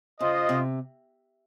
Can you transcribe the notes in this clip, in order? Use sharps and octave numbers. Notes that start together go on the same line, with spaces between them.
C#3 F4 C5 D#5
C3